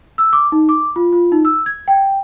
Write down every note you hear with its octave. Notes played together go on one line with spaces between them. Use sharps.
E6
D6
D#4
D6
F4
F4
D#4
E6
G#6
G5